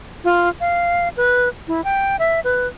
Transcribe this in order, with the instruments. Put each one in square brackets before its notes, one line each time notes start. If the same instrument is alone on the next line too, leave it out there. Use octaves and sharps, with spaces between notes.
[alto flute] F4
F5
B4
E4
G5
E5
B4